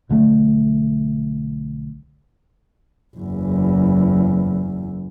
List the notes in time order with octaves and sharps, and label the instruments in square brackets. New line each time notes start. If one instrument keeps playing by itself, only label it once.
[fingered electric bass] B1 D3 F3 A3
[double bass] F#1 E2